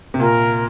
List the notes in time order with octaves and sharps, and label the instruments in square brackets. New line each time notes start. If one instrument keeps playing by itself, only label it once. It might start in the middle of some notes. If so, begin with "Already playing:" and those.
[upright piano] C3
[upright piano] A#2 [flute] A#4